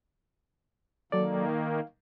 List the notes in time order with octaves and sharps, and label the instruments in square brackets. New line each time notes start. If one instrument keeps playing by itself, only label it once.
[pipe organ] D#3 A#3 [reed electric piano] F#3 A4 D5
[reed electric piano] F5